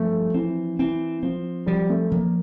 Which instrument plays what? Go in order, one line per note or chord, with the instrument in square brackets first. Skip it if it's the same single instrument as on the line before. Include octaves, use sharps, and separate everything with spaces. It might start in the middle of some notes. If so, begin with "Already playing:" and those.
Already playing: [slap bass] G2 F3 [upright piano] A3
[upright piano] E3 [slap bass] C4
[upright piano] E3 [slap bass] C4
[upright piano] F3 [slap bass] C4
[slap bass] F3 [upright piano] G3
[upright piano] A3
[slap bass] F3 [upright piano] A#3